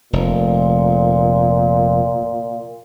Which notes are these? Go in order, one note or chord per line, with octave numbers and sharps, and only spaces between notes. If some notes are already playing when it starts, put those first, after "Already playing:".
F1 A#2